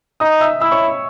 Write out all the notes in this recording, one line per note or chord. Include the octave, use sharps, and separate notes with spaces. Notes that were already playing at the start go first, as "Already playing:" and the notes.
D#4 D#5 D#6
E5 E6
E4 E5 E6
C#5 C#6